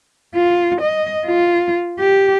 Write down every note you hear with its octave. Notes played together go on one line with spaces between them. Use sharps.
F4
D#5
F4
G4